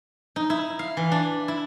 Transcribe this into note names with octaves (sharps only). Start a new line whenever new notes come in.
D#4
E4
F5
E3
D4
E4